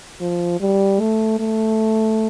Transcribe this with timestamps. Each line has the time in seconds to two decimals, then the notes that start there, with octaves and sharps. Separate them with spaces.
0.21 F3
0.60 G3
1.00 A3
1.39 A3